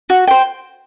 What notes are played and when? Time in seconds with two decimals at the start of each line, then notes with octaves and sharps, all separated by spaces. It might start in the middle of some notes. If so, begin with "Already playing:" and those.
0.10 F#4
0.27 C5 G5